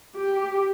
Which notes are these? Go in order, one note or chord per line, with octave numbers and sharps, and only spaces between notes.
G4